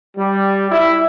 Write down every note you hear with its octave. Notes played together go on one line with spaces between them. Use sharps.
G3
E4